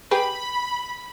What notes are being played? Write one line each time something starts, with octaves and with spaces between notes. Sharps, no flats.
G4 G#4 B4 B5